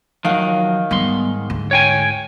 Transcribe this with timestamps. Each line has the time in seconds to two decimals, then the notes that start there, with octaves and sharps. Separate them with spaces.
0.25 D#3 F3 F#3 F5 F#5
0.91 G#2 G3 B3 C6
1.50 D2
1.71 C#5 G5 G#5